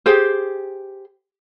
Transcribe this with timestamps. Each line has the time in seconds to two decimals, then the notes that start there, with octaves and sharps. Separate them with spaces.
0.06 G4 G#4 C5